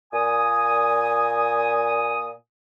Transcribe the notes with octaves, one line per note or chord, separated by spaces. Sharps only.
A#2 G#5 D#6